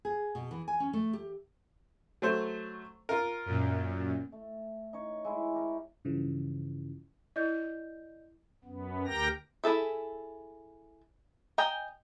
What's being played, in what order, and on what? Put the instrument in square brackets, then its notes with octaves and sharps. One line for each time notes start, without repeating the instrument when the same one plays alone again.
[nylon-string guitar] G#4
B2
E3
G#5
C#4
A3
G4
[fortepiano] F#3 A3 C5
F4 A#4
[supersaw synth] F#2 A#2
[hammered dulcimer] A3
D#4 C#5
G#3 E4
G4 A#4
[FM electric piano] G2 C#3 E3 F3
[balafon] E4 [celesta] D5 D#5 G6
[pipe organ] F#2 B3
D2 G4 A#4 G5 A#5 A#6
[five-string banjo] E4 G#4 A4 E5
D#5 G5 G#5 A#5